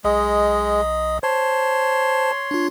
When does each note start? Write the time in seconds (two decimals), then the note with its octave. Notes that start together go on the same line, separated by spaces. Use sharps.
0.04 B1 G#3 D#5 D#6
1.23 C5 C#5 A5 C6
2.51 D4 F4